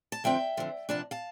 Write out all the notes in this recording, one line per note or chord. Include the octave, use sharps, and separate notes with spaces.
A5
D3 F3 C4 E5 G5
D3 F3 C4
C3 F3 B3 D4 A5
F5 A5